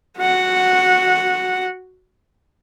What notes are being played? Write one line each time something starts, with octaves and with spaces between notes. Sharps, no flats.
F#4 F#5